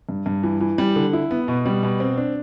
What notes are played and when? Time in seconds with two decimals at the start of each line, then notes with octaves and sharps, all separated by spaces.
0.09 G2
0.26 G2
0.43 E3
0.61 E3
0.78 G3
0.96 D3
1.13 E4
1.31 B3
1.48 B2
1.65 G3
1.83 B2
2.00 C4
2.17 D4